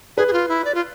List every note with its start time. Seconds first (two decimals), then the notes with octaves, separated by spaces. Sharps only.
0.17 G#4 B4
0.27 G#4
0.33 F4
0.49 E4
0.65 D5
0.75 F4